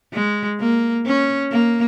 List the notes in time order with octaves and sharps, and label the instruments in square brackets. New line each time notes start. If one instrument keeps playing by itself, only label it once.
[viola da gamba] G#3
A#3
C#4
A#3